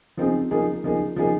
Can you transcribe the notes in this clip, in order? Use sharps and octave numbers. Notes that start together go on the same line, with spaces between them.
F3 C4 D#4 G#4
F3 A#3 D#4 G#4
F3 A#3 D#4 G#4
F3 A#3 D#4 G#4